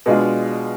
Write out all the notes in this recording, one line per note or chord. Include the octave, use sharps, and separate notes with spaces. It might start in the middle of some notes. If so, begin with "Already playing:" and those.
B2 G#3 D4 F4